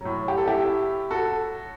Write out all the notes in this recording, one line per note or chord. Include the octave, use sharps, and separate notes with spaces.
A2 F#3
G4
A4
E4 G4
F#4 A4